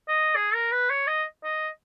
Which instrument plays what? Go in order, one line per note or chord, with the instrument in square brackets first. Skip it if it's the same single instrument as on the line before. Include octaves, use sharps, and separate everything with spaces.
[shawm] D#5
G#4
A#4
B4
C#5
D#5
D#5